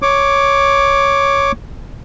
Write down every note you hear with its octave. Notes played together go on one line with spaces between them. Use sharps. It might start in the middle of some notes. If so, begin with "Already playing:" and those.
C#5 D6